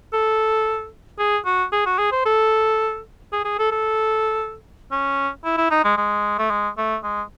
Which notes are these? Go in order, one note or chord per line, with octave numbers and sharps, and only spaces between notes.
A4
G#4
F#4
G#4
F#4
G#4
C5
A4
G#4
G#4
A4
A4
C#4
E4
E4
D#4
G#3
G#3
A3
G#3
A3
G#3